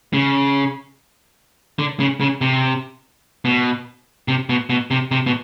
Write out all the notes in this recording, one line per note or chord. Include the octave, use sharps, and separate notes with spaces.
C#3
D3
C#3
C#3
C3
B2
C3
B2
B2
C3
C3
B2